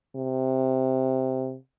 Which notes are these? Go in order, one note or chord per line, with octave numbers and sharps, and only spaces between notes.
C3